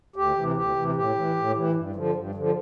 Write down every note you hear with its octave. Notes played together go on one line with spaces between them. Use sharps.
D2 G4
C3 E3
D2 G4
C3 E3
A2 G4
E3
A2
E3
G2
D3 F3
G2
D3 F3